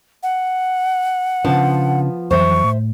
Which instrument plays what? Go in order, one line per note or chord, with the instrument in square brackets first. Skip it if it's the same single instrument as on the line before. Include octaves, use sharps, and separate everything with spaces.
[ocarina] F#5
[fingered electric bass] C#3 C#4 D4 [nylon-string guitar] F3 B3 A5
[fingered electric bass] F2 E3 F#3 [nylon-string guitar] C5 E5 [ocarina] C#6
[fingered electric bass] A2